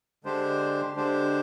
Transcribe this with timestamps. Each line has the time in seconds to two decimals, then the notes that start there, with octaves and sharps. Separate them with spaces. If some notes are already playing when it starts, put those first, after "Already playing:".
0.24 D3 G#3 D4 G4 C5
0.96 D3 G#3 D4 G4 C5